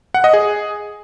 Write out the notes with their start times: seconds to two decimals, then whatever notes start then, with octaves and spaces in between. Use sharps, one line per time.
0.14 F#5
0.24 D#5
0.33 G#4